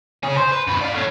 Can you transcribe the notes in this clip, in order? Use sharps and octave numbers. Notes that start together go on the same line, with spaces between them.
C#4 G#4
C5
B4
F#2 B4
D5 F5
A3 C#4